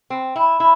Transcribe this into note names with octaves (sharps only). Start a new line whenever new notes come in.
C4
E4
E4